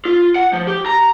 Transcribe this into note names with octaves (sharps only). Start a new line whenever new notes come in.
F4
F#5
F3
G4
A#5